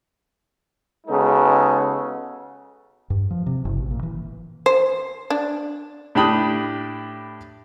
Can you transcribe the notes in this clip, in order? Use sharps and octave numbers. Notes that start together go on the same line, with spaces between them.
C#3 G#3 B3 D#4 F#4 A4
G2
F3
C3
F#1
A1
A#2
E3
C5
D4
A2 D4 G4 B5 D#6